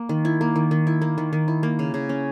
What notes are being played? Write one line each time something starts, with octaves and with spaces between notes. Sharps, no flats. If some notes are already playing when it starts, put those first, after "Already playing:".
Already playing: A#3
D#3
E4
A#3
D#3
D#3
E4
A#3
D#3
D#3
E4
A#3
C#3
C#3
C#4